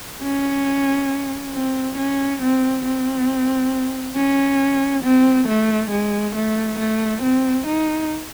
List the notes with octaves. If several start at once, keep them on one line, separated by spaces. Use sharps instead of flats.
C#4
C4
C#4
C4
C4
C#4
C4
A3
G#3
A3
A3
C4
D#4